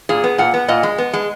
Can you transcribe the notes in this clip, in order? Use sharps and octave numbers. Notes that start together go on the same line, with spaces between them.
A#2 G#4
B3
A#2 F#5
B3
A#2 D#5
G#3
B3
G#3